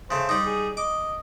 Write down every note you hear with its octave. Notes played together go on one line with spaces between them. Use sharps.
C#3 A3 C5
G3 D#4
G#4
D#5 D6